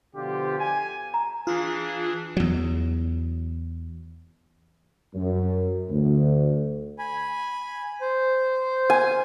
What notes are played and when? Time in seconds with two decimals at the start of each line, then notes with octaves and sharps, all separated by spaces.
0.16 B2 D3 F3 F4 G4
0.59 G#5
1.14 A#5
1.47 E3 D4 F4 G#4
2.37 E2 F#3
5.14 F#2
5.90 D2
6.99 G#5 B5
8.01 C5
8.90 G#5